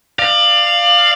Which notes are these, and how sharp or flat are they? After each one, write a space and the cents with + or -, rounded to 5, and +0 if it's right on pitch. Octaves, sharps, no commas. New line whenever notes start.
D5 +25 F5 +0